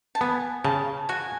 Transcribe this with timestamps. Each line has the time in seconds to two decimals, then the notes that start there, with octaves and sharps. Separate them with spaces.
0.15 A5
0.21 B3 G#5
0.64 C#3 A5
1.09 F#4 G#5